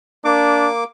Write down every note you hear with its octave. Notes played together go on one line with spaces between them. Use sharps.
A#3 D4 D6